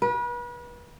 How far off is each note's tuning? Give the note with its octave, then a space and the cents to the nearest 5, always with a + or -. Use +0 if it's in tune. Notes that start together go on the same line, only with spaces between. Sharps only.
B4 -35